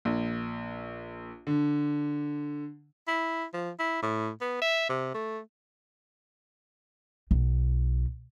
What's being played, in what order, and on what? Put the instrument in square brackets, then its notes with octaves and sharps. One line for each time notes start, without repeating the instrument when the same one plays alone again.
[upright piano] A#1
D3
[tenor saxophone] E4
F3
E4
A2
B3
E5
C3
A3
[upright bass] B1